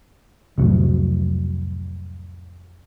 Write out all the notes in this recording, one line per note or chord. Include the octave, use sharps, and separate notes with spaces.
C2 F2 A2 F#3